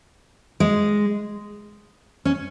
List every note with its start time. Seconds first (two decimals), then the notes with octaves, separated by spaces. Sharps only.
0.60 G#3
2.25 C#4